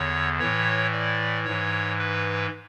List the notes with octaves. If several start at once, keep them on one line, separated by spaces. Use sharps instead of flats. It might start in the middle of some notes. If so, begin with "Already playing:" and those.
Already playing: E2 D3 C#5
A2 E3 C#5
D5
G#2 E3 C#5
B4